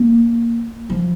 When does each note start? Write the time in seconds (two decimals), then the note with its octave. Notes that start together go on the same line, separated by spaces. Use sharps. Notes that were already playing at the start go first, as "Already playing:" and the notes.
Already playing: A#3
0.90 F3